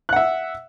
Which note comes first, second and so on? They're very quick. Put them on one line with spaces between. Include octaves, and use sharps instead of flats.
F#6 F#5 E5